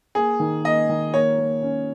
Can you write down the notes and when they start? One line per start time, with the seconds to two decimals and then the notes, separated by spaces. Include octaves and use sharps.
0.15 A#3 G#4
0.40 D#3
0.64 A#3 D#5
0.89 D#3
1.14 A#3 C#5
1.38 A#3
1.63 C#4